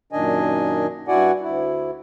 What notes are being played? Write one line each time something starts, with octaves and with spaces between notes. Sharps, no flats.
F#2 A#2 D#3 D4 D#5 G#5
G2 E4 F#4 D5 F#5 G#5
D2 E4